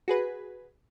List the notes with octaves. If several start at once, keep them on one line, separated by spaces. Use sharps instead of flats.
F#4 G#4 B4